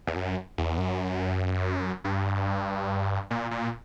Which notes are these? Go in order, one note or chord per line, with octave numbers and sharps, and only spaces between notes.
E2
F#2
E2
F#2
G2
A#2
A#2